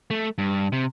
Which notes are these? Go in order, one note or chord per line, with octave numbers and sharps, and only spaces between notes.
A3
G2
C3